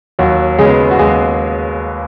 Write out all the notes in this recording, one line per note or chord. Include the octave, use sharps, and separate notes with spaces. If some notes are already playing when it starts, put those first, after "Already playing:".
D#2 F#3 F#4
C#3 G#3 B3 G#4
F#4
D#2 G#3 G#4